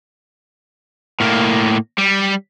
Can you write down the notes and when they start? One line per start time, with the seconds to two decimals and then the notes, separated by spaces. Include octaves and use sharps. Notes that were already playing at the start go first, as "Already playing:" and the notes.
1.20 A2 A#3
1.98 G3